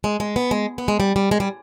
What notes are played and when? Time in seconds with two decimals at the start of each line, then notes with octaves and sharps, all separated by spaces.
0.04 G#3
0.20 G#3
0.36 B3
0.51 G#3
0.78 B3
0.88 G#3
1.00 G3
1.16 G3
1.31 G#3
1.40 G3